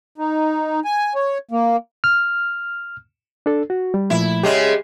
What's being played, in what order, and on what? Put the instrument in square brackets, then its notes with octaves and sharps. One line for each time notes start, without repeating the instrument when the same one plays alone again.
[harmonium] D#4
G#5
C#5
A#3
[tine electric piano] F6
[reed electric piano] D4 A4
F#4
G3
[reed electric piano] A#2 F3 A3 [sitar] E4
[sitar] C#3 G#3 C#4 [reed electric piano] G4